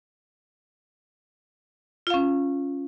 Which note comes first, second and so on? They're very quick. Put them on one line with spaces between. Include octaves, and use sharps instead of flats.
F4 F5 C#4